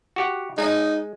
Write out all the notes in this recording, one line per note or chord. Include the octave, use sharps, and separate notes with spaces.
F#4 G4 F#5
G#3 D#4